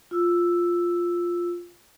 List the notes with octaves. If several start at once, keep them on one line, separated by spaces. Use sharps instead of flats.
F4 E6